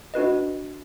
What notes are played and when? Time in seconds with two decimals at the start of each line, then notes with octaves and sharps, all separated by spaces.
0.14 D4 F#4 B4 D#5